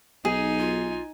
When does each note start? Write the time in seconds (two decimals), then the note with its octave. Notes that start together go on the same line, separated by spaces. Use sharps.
0.25 B1 D#4 G#4 G#5
0.59 F4